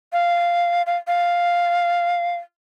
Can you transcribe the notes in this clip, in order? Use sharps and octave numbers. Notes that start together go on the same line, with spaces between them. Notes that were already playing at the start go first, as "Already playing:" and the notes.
F5
F5
F5